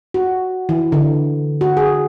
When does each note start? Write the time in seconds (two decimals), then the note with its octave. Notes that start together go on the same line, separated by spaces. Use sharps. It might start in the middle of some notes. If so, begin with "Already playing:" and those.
0.14 F#4
0.69 E3
0.92 D3
1.61 F#4
1.77 G#4